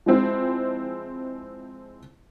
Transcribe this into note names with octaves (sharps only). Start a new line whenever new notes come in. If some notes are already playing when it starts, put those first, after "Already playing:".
F3 G#3 C4 E4